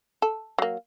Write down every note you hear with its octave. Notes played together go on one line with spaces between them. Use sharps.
A4
F#3 A#3